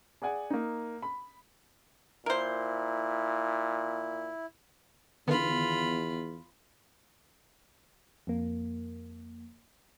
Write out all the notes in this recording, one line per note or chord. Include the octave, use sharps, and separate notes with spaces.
G#4 D5 F#5 G#5
A#3 D#4
B5
A#2 E4 A#4 C5
E2 D3 D#3 B3 F4 B5
F2 A#3